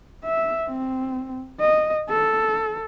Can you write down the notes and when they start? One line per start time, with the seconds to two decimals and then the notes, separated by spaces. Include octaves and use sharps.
0.24 E5
0.68 C4
1.60 D#5
2.09 A4